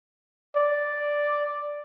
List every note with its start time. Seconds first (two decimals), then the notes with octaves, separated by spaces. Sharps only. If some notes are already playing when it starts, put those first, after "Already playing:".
0.56 D5